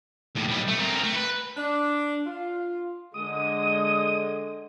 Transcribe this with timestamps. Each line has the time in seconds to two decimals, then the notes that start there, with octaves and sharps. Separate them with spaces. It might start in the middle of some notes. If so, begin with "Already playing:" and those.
0.36 D#2 A2
0.49 B1 G3
0.68 A3
0.80 C4 A#4
1.04 A3
1.16 B4
1.57 D4
2.26 F4
3.14 D3 G#3 D#6